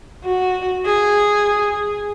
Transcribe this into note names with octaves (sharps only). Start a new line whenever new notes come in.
F#4
G#4